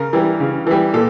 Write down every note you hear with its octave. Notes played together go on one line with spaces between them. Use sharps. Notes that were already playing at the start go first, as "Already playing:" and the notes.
Already playing: C#3 A#4
E3 G3
C#3
E3 G3
A#2 A4